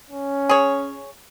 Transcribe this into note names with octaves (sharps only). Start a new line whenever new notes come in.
C#4
G#4 C#5